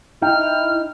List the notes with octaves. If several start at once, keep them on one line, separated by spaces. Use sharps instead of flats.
D#4 E4 G5 F6